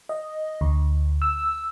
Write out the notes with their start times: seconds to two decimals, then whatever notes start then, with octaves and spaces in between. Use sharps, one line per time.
0.09 D#5
0.61 D2
1.22 E6